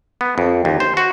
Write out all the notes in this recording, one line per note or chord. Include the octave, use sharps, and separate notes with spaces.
B3
F2
D#2
C5
F#4